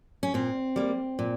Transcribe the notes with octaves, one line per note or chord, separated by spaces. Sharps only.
C#4
A#2 C4
G3 A#3
A#2